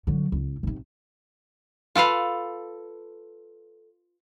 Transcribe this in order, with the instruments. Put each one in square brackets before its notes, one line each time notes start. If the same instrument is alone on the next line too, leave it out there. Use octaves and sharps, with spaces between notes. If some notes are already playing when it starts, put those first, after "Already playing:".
[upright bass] D3 F#3
C#2
B1 C3
[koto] F4 A4 B4 F5